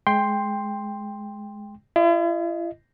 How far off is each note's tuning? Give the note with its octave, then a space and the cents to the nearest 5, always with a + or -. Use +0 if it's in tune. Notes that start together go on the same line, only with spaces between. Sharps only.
G#3 +15 G5 +15 C6 +0
E4 +45 D#5 +0